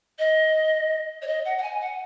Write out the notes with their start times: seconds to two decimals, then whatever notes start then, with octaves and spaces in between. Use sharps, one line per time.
0.19 D#5
1.22 C#5
1.27 D#5
1.45 F#5
1.58 F#5
1.63 G#5
1.81 F#5